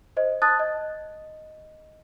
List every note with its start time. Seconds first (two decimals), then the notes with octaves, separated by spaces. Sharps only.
0.17 C5 D#5
0.42 A5 D#6 F#6 A6
0.59 D#5